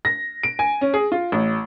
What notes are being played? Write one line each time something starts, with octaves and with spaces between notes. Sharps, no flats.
A#6
D7
G#5
C#4
G#4
F4
A1